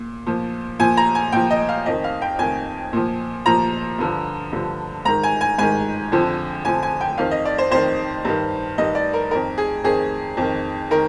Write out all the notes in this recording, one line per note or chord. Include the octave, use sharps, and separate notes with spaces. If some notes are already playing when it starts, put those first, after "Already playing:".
Already playing: A#2
A#2 F3
A#2 F3 G#5
A#5
G#5
A#2 F3 G5
D#5
F5
F2 D#3 D#5
F5
G5
F2 D#3 G#5
A#2 F3
A#2 F3 A#5
G2 D3 F3
G2 D3 F3
G#2 D#3 A#5
G#5
G#5
G#2 D#3 G#5
F2 D3 F3
F2 D3 F3 G#5
G#5
G5
F2 D#3 F5
D#5
D5
C5
F2 D#3 C5
G2 D#3
G2 D#3 D#5
D5
A#4
F2 D#3 A#4
G#4
F2 D#3 G#4
F2 D#3
D#3 A#4